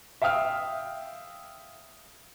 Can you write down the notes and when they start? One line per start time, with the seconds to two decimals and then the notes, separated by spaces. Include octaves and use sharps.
0.22 E5 F5 G5 D#6 F6